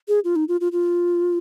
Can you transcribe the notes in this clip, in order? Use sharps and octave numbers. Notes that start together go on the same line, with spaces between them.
G#4
F4
D#4
F4
F4
F4